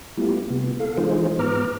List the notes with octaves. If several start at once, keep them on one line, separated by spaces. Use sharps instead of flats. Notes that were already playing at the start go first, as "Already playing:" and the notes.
G3 A3 B3 E4 F4 G4
C3 B3
A4 F5
E3 G#3 D#4 F4 G#4 C5
G#2 B3 B4 A#5 D6 F6